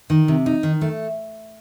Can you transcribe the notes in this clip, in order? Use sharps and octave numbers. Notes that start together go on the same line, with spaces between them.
D#3
C3
D#4
D#3
A3